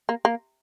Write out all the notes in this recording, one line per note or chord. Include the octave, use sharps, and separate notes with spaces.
A#3
A#3